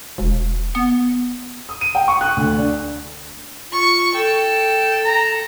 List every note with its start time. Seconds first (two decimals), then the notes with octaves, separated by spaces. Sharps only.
0.18 E1
0.75 B3
1.69 D#6
1.81 D#7
1.95 G5
2.08 C#6
2.21 F#6
2.37 D2
2.58 D4
3.72 F4 C#6
4.14 A4 G5
5.05 A#5